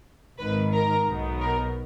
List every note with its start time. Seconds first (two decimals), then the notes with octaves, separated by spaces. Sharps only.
0.38 G#1 G#2 D#3 B4 B5
0.72 A#4 A#5
1.06 B1 B2 F#3 B3 D#4
1.40 A#4 A#5